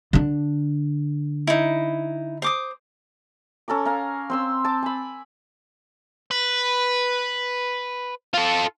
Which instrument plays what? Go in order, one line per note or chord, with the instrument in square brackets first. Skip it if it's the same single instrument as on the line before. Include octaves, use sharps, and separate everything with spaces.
[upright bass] D3 D4
[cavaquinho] D#4 E4
C5 D6 D#6
[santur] C#4 A4 A#5 D6
F5 G#5 A#5
C4 C6 E6
A5 D6
G#5 B5
[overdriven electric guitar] B4
F4 A4